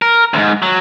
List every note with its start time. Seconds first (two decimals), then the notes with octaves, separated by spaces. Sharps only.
0.02 A#4
0.34 D2 G#2
0.62 F#3